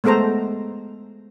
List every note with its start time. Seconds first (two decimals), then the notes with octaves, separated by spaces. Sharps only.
0.04 G#3 A3 B3 A4 C5 A#5